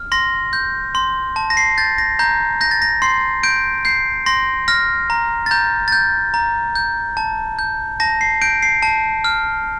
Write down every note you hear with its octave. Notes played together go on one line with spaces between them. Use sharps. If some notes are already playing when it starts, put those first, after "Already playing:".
Already playing: F6
C6 A#6
G6
C6
A5
A#6
C7
G6 A6
A#6
A#5 G6
G6 A#6
A6
A#6
C6 C7
G6 D7
G6 C7
C6 A#6
F6 A#6
A#5
A6
A#5 G6
A6
G6
A#5
G6
A5
G6
A5 A#6
C7
G6 D7
C7
A5
F6